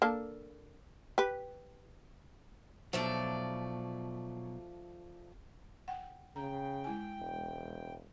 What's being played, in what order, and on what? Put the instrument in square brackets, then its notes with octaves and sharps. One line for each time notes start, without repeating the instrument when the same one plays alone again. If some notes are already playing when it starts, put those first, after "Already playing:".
[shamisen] A#3 D4 A4
G4 B4
[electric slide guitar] B2 F#3 [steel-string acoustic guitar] F3 A3 D5
[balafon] F#5 G5
[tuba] C#3 [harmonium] G5 [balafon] A#5
[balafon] G#3 E4 G#5
[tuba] E1